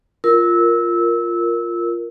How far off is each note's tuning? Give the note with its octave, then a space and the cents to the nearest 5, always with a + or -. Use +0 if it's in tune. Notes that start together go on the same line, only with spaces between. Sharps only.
F4 +0 A#4 +0 E6 -20